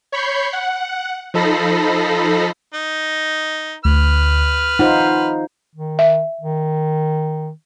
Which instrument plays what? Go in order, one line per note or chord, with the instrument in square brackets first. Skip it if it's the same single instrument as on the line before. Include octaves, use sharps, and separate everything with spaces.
[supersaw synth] C#5 B5 C#6 G6 C7
F#5
F3 D#4 A4 B5 A#6 C7
[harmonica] D#4
[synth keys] D2 [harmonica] B4 F6
[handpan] D#4 F4 C5 [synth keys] F#5
[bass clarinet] D#3
[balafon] E5
[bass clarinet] D#3